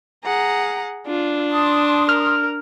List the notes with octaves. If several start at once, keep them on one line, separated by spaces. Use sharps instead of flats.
G#4 F#5 A#5
D4 F4
A5 C6 D#6
A#4 F6